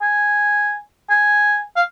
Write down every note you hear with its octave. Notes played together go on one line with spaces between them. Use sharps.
G#5
G#5
F5